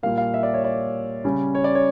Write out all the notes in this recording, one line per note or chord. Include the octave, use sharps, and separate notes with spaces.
A#2 G3 A#3 F5
F5
E5
D5
C#5
D5
C#3 G3 C#4
C#5
D5
C#5